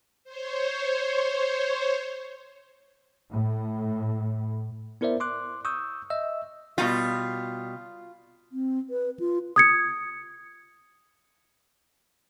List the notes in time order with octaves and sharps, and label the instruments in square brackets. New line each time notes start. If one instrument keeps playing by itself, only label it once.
[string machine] C5 C#5
[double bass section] A2
[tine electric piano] B3 E4 A#4 C5 D5 E5
C6 D6 F#6
C#6 D#6 E6 G6
D#5 E5 E6
[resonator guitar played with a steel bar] B2 G3 [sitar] F4
[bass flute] C4
B4
F4
[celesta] D#6 G#6 C#7